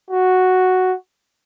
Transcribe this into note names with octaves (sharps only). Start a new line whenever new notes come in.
F#4